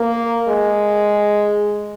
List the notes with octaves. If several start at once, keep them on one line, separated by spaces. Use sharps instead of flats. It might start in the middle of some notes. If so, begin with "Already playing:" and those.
Already playing: A#3
G#3